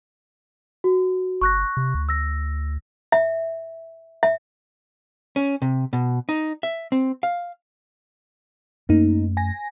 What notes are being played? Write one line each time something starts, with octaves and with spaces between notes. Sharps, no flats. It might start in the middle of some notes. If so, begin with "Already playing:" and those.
F#4
G1 C#6 F#6 A#6
C3
D2
E6 A#6
E5
E5
C#4
C3
B2
D#4
E5
C4
F5
F#2 A3 A#3 C#4 D#4
G#5 A#6